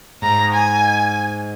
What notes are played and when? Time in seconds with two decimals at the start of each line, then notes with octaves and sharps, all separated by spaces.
0.22 G#2 A#5
0.54 G#5